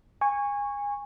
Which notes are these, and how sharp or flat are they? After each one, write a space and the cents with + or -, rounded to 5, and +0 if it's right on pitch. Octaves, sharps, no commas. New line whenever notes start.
G#5 -25 C#6 +0